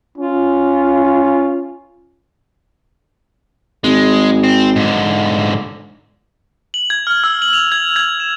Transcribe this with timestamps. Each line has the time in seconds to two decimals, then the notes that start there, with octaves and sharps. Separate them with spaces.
0.18 C#4 F4
3.84 G#1 G#3
4.44 C4
4.76 G#2 D3
6.74 F#7
6.90 G#6
7.07 F6
7.24 E6
7.42 F#7
7.53 F7
7.72 G#6
7.96 G#6
8.20 E7